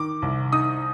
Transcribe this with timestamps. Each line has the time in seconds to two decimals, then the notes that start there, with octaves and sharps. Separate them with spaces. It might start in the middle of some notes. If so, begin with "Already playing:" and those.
Already playing: D#3 D6
0.22 C2
0.52 D#4 D#6